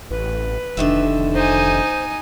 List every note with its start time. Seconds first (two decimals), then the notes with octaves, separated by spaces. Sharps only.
0.11 A1 B4
0.77 F1 D3 D#3 E5
1.34 D#4 C5 G#5